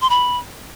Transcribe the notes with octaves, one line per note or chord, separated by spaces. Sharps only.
C6
B5